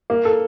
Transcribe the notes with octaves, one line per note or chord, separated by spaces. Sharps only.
A#3
A4